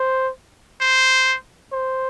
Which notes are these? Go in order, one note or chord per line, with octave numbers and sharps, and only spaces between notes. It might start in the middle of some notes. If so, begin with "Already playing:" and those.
Already playing: C5
C5
C5